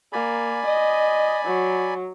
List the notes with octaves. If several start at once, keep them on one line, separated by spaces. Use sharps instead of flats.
A#3 D5 G#5 B5
D#5
F#3